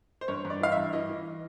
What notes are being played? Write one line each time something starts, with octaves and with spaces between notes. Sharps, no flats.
C5
G2 C#5
G2
D5
E3 F5
E5
G2
E3 D#5
E3